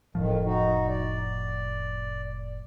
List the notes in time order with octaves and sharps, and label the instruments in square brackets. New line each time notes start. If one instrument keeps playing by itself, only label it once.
[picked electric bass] F1 A2 F3 [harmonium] F2 D#3
[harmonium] D#4 F#4
D5